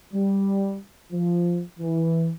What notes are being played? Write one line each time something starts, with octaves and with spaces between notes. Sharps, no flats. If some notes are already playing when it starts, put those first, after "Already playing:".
G3
F3
E3